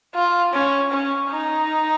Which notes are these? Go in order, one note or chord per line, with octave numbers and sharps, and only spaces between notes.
F4
C#4
C#4
D#4